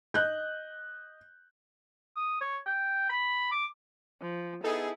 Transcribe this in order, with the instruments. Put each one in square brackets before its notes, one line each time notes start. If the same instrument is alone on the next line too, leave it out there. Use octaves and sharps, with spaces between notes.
[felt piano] D#5 F#6 G6
[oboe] D#6
C#5
G5
B5
D6
[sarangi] F3
[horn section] B3 D#4 G#4 [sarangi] E4 [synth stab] A4